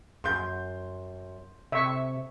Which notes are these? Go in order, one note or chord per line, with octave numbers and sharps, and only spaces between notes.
F#2 C6 G6
C3 E5 C#6